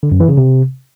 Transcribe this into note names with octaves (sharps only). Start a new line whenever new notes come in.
D3
F#2
E3
C#3
C3